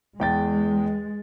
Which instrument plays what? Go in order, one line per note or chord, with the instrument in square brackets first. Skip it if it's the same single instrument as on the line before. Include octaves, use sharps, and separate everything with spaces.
[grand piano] E2 G5 A6 [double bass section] G#3